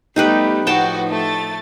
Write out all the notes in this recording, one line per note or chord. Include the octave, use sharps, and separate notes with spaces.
G3 A3 B3 D#4 G4 B4
A2 F3 D#4 F#4 B4 G5 A5
A3 A6